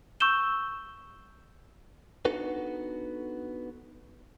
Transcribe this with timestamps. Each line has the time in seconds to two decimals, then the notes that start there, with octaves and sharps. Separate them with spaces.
0.20 C#6 E6 G6 E7 G7
2.25 B3 D4 D#4 F#4 A4 B4